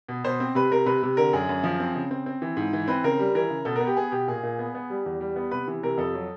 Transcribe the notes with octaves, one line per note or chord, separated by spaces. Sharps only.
B2
B2 C5
C4
C3 B4
C3 A#4
C3 B4
C3
D3 A#4
F#2 G#4
F#2
F3
C4
C#3
C4
C4
E3
G#2
E3
C4 B4
C#3 A#4
G3
E3 A#4
C#3
B2 A4
A#4
B3
G4
B3 G#4
B2 G4
A#2 G#4
A#2
B3
B3
G3
E2
G3
B3
C3 B4
E3
C3 A#4
F2 A4
F#3